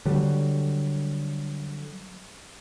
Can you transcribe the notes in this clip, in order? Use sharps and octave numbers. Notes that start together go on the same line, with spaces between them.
D3 F#3 G3